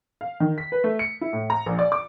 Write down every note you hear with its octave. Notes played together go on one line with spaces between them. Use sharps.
F5
D#3
B6
B4
A3
C#7
E4
A2
A#5
A#1
D5
D6